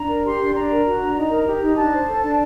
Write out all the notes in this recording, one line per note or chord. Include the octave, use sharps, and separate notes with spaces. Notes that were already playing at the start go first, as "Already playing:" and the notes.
Already playing: D4 A#5
A#4
G4 C6
D4
D4 A#5
A#4
F#4
D4
D#4
A#4
G4
D#4
D4 A5
C5
A4
D4